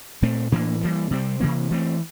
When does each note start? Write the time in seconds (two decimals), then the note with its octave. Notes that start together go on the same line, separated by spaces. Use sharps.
0.22 A#2 A3 C4
0.52 A2 E3 A#3 D4
0.81 E3 G3 A#3
1.11 C3 G3 C4
1.41 C3 E3 A#3
1.71 E3 A3 C4